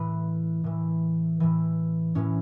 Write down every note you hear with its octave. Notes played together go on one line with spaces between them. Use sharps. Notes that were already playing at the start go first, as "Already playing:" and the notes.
Already playing: A2 E3 B4
A2 E3
A2 E3
A2 E3 C#4